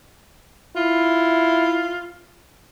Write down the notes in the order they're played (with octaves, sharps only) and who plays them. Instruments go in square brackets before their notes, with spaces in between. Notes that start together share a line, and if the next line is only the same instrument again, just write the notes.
[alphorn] E4 [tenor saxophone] F4